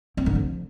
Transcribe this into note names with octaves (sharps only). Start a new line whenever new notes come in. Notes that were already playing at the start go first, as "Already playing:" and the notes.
C4
D3
F3